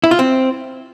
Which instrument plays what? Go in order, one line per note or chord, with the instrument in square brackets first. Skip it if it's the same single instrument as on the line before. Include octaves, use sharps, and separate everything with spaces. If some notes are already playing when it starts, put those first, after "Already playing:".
[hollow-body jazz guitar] E4
F4
C4